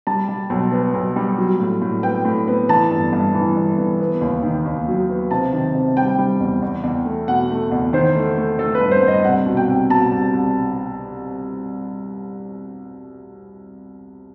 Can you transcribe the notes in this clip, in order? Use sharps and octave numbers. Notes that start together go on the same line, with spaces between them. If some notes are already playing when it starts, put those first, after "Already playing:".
G3 A5
G3
B1
B3
B1
G3
F#3
A2
A2
B3 G5
A2
B3
E3 A5
G1
G2
E3
G1
E3
B3
D#2
D#3
D#2
F#3
B3
C3 A5
D#3
C3
G3 G5
G3
E2
E2
E2
A3
B2 F#5
A3
E2
D#3 C5
A3
A3
A3 A4
B4
G2
C5
G2
D#5
C2 F#5
B2
G5
C2
B2 A5
C2
C2